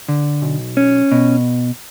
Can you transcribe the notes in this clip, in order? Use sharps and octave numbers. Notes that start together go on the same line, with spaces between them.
D3
B1
C#4
B2